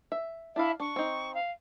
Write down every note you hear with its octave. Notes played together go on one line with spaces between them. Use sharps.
E5
D4 E4 D5 E5 F5
D4 C#6
C4 D#4
F5